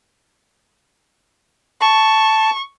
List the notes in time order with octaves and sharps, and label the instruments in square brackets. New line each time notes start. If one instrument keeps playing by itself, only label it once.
[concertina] A5 [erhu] C#6